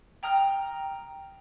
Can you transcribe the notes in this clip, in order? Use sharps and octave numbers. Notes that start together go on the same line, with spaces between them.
G5 A#5 D#6 F6